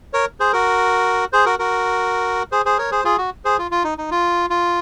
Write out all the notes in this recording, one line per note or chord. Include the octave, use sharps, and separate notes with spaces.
A#4 C#5
G#4 C5
F#4 A#4
G#4 C5
F#4 A#4
F#4 A#4
G#4 C5
G#4 C5
A#4 C#5
G#4 C5
F4 G#4
F#4
G#4 C5
F4
F4
D#4
D#4
F4
F4